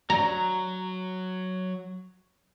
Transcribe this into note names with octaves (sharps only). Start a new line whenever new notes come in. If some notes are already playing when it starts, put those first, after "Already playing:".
F#3 A#5